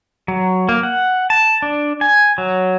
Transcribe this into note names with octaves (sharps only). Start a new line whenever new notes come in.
F#3
A#3
F#5
A5
D4
G#5
F#3